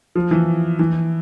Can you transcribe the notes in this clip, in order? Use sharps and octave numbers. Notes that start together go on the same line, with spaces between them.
F3
E3
E3